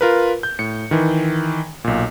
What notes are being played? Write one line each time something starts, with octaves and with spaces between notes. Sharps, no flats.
F4 A#4 B4
G6
A2 C#7
D#3 E3
B1 A#2